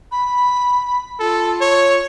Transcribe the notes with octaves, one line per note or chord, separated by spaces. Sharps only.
B5
F4 A4
C#5